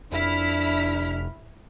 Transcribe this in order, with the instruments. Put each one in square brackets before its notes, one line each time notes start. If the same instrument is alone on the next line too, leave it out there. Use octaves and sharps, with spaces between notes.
[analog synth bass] F1 [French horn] D4 [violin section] E4 F6 B6